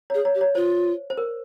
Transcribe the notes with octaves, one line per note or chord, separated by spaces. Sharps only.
G#4 C#5
C#5
G4
C#5
F4 C5
C5
A#4